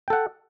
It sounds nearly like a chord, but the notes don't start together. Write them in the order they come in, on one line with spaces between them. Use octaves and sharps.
G5 A4 F#5